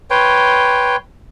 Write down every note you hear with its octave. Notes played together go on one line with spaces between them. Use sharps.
B4 C#5 G5 C6